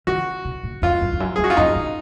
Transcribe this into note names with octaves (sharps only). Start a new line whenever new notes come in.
D#3 F#4
B2
A#2
F2 F4
F#2
F2
F#2
G#4
F2
F#4
F4
F#2 D#4
A#2